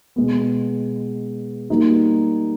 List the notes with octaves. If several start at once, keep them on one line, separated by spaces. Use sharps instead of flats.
B2 G#3 B3
G3 A#3 D#4 F#4